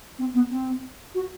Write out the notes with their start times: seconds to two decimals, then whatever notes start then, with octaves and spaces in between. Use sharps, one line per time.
0.19 C4
0.34 B3
0.51 C4
1.15 F#4